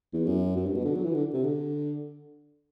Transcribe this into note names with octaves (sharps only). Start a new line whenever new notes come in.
E2
F#2
F#2
G2
B2
D3
F#3
E3
D3
C3
D3